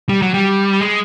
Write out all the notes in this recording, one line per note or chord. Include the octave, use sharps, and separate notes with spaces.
G3
F#3
G3
G#3